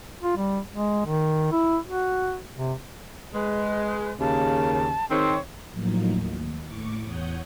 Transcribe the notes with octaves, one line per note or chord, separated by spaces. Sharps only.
F4
G3
G#3
D#3
E4
F#4
C3
G#3 B4
D#2 C#3 A5
D#3 G#3 C4 C#5
A2 F3 F#3 A#3 D#4
D#2
A2 C#6 D6
E2 C#5 F#5 D#6 G6